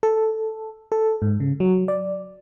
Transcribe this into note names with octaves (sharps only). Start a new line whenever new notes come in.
A4
A4
G#2
C#3
F#3
D5